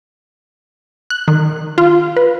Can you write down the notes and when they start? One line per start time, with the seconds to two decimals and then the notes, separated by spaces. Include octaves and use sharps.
1.10 F#6
1.28 D#3
1.78 F4
2.17 B4